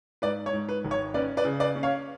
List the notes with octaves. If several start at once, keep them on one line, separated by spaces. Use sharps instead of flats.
G#2 B4 D5
C#5
G#2
B4
G#1
C#5
C#4 B4 D5
B4 D5
C#3
B4 D5
C#4
C#5 F5